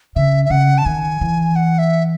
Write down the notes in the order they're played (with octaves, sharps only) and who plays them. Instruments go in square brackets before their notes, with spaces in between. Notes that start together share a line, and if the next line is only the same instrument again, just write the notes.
[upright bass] C#3 [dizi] E5
[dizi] E5
[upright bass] C#3 [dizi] F#5
[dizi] A5
[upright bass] D#3 [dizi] G#5
[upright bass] E3
[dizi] F#5
E5